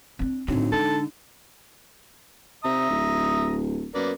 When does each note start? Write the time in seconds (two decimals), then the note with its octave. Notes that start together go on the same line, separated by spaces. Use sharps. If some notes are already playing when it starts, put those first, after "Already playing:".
0.19 C4 D4
0.48 A2 D3 F#3 C4 D#4
0.72 D3 G#3 A4
2.65 C3 E5 A#5 D#6
2.90 D1
3.95 F#2 A#3 B3 D5